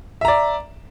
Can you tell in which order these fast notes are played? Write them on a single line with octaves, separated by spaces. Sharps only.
E5 A#5 D5